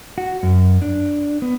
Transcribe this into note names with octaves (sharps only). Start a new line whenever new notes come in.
F#4
F#2
D4
B3